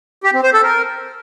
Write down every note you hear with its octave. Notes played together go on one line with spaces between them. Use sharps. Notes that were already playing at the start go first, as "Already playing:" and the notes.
G4
C4
C5
A4
A#4